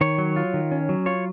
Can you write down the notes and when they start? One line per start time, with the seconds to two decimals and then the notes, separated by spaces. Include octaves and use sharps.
0.01 D#3 C#5
0.18 F#3
0.36 F4
0.54 D#3
0.72 C#4
0.89 F#3
1.06 F4 C#5